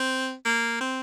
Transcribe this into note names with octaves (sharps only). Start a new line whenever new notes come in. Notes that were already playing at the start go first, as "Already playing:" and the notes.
Already playing: C4
A#3
C4